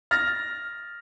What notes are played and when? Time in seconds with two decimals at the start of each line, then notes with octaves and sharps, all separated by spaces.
0.11 F6 A6 A#6